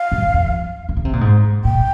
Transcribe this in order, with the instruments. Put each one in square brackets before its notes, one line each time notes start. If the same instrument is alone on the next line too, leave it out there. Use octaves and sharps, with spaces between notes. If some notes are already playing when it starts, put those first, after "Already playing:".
Already playing: [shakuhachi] F5
[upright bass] G2
F2
D#3
C#3
C3
A#2
G#2
[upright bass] A#2 [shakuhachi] G5